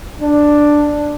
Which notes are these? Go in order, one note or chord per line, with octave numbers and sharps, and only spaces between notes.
D4